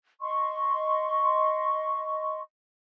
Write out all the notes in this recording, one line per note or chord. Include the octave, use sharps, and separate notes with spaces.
D#5 C6 C#6